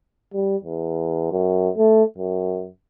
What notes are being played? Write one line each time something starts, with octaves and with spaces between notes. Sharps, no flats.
G3
E2
F#2
A3
F#2